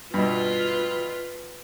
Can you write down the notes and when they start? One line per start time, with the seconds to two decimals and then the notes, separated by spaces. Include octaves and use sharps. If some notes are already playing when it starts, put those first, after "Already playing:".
0.14 G2 B2 F4 B4